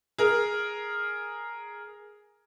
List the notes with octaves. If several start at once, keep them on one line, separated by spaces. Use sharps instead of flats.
G#4 A#4